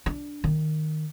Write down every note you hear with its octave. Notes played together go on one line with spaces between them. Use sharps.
D4
D#3